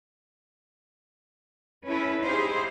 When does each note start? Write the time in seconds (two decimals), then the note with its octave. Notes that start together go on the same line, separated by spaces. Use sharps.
1.87 C#4 E4 A4 B4
2.23 D#4 E4 G4 G#4 C5 F5